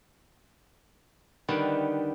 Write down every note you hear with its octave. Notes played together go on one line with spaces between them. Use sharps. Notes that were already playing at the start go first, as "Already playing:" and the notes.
D3 D#3 G3 B3 B4